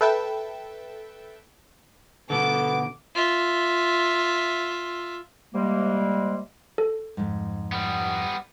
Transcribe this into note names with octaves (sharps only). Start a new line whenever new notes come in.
A4 B4 E5 G5 A5
B2 D3 B3 A4 D6
F4 E5
C3 G3 G#3 A#3
A4
F2 G#2
G3 B3